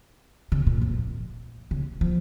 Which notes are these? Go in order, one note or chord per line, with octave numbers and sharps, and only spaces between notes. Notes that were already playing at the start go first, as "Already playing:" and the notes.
C#3
A#2
F2
C#3
F3